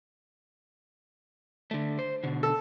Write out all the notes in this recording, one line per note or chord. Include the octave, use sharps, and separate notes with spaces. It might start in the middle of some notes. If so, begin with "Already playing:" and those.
D3 A3
C5
B2 D3
A4